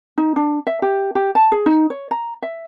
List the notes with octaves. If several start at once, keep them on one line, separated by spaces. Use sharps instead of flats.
D#4
D4
E5
G4
G4
A5
G#4
D#4
C#5
A#5
E5